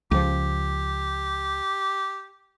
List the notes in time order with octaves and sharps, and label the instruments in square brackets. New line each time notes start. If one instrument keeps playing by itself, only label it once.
[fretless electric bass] C#2 F3 [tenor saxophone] G4